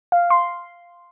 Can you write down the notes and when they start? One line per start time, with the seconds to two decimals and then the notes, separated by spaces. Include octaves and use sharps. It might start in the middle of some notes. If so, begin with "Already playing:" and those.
0.12 F5
0.30 C6